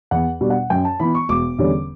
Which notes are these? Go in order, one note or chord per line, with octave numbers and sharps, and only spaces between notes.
E2 F#5
B2 G3 D4
F#5
F#2 G5
A5
E3 B3 B5
C#6
E1 D6
E2 D3 G3 C#4